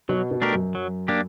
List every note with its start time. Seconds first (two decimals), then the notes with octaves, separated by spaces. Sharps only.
0.09 B2 F#3
0.31 B2
0.42 A3 D4 G4 A#4
0.53 F#2
0.75 F#3
1.08 A#3 D4 G4